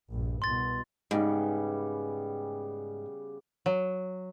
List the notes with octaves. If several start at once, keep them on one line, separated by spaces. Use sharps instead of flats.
A#1 G2
C2 B2 C6 A6
G#2 C#3 G3 B3
F#3